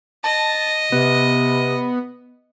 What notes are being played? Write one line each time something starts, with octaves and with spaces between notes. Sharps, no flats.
D#5 A5
C3 B3